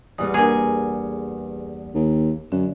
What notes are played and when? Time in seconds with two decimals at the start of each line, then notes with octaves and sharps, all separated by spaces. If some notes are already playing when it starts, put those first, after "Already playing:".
0.18 E2 G3 B3 D#6
0.34 A#3 D4 G#4 A#4 G#5
1.95 D#2
2.52 F#2 D3